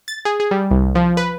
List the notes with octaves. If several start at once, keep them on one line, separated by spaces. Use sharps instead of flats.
A6
G#4
G#4
G3
C2
F3
B4